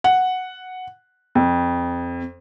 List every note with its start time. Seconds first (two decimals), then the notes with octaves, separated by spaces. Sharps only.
0.04 F#5
1.35 F2